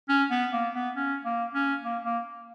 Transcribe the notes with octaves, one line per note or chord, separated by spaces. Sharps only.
C#4
B3
A#3
B3
C#4
A#3
C#4
A#3
A#3